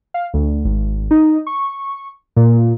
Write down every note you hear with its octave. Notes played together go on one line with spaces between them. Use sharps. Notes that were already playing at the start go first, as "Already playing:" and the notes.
F5
D2
G#1
D#4
C#6
A#2